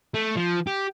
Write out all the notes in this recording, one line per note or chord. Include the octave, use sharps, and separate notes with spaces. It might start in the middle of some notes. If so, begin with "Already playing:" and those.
A3
F3
G4